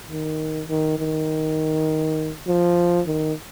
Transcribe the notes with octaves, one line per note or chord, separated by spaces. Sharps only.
D#3
D#3
D#3
F3
D#3